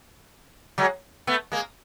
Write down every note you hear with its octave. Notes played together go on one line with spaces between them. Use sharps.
F#3 G#3
A3 B3
G#3 A#3